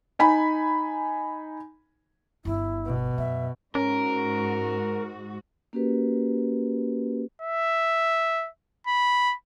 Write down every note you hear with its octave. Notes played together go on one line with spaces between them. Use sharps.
D#4 G#5 B5
G1 B3 E4
B2
F#2 E5
G#2 C#4 F#4 A#4
A#3 C#4 F#4 G4 A#4 B4
E5
B5